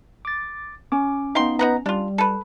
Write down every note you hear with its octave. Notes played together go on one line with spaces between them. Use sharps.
D6 A6
C#4 D6
B3 D#4 F5 G5 C6
B3 D#4 B4 F#5 A#5
G3 D4 F4
A4 B4